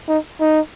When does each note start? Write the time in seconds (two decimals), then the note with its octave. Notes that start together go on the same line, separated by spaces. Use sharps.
0.08 D#4
0.41 D#4